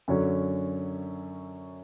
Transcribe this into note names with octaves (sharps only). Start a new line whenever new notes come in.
F#2 D3 F#3 C#4